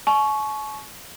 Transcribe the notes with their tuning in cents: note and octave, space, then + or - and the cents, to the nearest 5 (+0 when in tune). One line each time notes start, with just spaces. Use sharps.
G#5 +45 C#6 +0